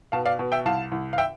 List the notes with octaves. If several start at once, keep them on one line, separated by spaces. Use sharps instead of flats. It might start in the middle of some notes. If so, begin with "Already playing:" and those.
B2 F5 A5
D5 F5
B2
E5 G5
C2 F5 A5
C2
F5
E5 G5